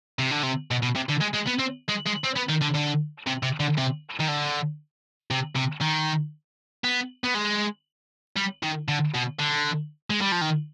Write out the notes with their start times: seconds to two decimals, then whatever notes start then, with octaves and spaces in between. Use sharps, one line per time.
0.19 C3
0.31 D3
0.43 C3
0.71 B2
0.83 B2
0.96 C3
1.09 D3
1.21 G#3
1.34 G#3
1.48 B3
1.60 C4
1.89 G#3
2.07 G#3
2.24 C4
2.36 B3
2.49 D#3
2.62 D3
2.75 D3
3.27 C3
3.43 C3
3.60 D3
3.78 C3
4.20 D#3
4.28 D3
5.31 C3
5.56 C3
5.81 D#3
6.84 B3
7.24 B3
7.34 G#3
8.37 G3
8.63 D#3
8.88 D3
9.14 B2
9.39 D3
10.10 G#3
10.21 G3
10.32 F3
10.41 D#3